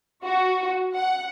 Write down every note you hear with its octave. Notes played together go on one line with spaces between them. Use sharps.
F#4
F#5